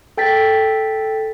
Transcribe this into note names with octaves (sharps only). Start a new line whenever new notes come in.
A4 G5 A6 B6